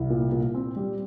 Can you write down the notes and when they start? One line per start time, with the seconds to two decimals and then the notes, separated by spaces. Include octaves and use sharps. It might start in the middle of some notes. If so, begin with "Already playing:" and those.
Already playing: C2
0.10 A#2
0.32 A#2
0.54 C4
0.76 G3